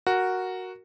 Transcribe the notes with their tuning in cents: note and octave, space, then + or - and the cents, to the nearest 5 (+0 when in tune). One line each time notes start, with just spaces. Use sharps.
F#4 +0 A#4 +0